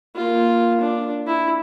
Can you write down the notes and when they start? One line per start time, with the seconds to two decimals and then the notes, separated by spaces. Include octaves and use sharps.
0.16 A#3 F4
0.81 D4
1.27 E4